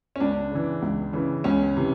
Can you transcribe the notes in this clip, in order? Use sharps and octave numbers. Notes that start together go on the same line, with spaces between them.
C#4
C#2 D4
C#3 E3
C#2
C#3 E3
C#2 C#4
C3 E3